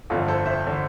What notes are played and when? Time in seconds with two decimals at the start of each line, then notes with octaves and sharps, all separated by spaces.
0.10 G1 F2 D3 F4 A4
0.28 A4 C5
0.46 C5 E5
0.67 D3